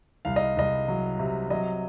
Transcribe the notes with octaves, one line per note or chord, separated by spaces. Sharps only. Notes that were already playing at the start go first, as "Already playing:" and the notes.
C2 F5
D#5
C2 D#5
F#3
C3
F#3 D#5